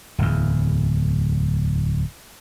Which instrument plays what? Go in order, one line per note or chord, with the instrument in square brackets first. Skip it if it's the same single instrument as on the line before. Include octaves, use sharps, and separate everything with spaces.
[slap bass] D1 E2